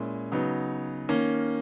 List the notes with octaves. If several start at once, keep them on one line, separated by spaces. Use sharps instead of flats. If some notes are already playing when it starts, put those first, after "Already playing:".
Already playing: A#2 G#3 C#4 E4
C#3 F#3 B3 D#4
D#3 A#3 C#4